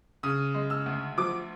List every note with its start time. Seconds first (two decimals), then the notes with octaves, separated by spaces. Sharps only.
0.23 C#3 D#6
0.54 G#3
0.70 E6
0.86 D2
1.18 F3 D6